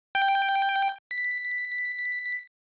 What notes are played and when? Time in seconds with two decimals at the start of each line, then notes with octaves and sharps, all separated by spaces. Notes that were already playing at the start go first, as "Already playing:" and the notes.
0.15 G5
1.11 B6